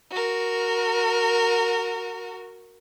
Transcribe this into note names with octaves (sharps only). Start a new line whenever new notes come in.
F#4 A#4